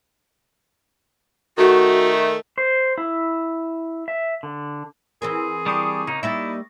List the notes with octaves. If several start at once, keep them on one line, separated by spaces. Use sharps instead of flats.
D#3 A3 F#4
C5
E4
E5
D3
E3 C4 G#4 A#4
G3 D4 G4 C#6 D#6 C#7
C#3 A#3 D#4
G3 A#3 D#4 E4 E5 A6 A#6